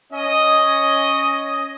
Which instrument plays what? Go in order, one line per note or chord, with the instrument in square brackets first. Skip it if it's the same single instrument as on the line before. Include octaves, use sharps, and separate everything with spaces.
[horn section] C#4 D#5